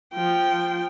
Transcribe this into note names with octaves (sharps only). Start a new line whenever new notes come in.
F3 G5